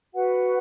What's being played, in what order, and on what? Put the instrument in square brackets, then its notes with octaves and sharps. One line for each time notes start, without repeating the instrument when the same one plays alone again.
[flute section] F#4 B4 F#5